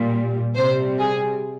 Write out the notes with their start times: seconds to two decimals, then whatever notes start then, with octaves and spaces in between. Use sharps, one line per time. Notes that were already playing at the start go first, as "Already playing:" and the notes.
Already playing: A#2 G3
0.55 C3 G3 C5
1.00 G#4